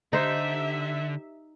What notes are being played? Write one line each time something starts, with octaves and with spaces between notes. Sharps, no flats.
D3 D#4 G4 C5 E5